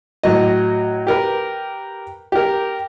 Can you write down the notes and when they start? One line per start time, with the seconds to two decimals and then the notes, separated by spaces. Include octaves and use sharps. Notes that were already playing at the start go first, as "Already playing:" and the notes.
0.23 A2 F#3 D#5
1.07 G4 A#4 B4
2.32 G4 A#4